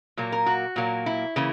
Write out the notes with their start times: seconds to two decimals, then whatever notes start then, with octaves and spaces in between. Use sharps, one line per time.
0.17 A#2 F#3 A#3
0.32 A#4
0.46 F#4
0.76 A#2 F#3 A#3
1.06 E4
1.36 C#3 E3 A#3